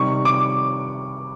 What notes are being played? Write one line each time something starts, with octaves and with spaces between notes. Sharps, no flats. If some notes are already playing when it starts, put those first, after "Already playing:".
Already playing: C3 D#3 G3 C#6
D6